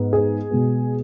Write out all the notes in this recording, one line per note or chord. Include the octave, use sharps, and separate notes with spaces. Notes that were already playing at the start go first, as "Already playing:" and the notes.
Already playing: G#2 G#3 B3
G#4
B2 G#3 B3